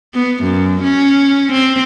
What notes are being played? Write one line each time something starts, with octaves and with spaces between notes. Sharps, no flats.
B3
F#2
C#4
C4